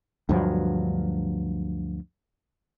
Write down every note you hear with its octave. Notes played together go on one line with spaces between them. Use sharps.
D2 G2 F3 F#3